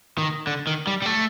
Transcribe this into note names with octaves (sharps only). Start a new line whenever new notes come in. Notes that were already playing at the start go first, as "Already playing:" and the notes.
D#3
D3
D#3
G3
G3
A3